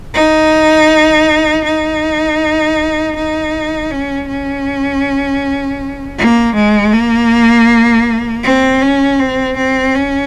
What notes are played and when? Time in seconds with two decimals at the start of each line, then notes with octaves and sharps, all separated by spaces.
0.14 D#4
1.64 D#4
3.16 D#4
3.91 C#4
4.28 C#4
6.18 A#3
6.55 G#3
6.93 A#3
8.44 C4
8.82 C#4
9.19 C4
9.57 C4
9.95 C#4